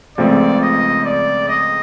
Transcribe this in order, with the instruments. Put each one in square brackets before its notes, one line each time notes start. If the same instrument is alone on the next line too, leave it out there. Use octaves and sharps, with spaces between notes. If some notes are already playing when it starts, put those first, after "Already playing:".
[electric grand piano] C#2 C#3 F3 A3 C4 [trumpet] D5
[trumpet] D#5
D5
D#5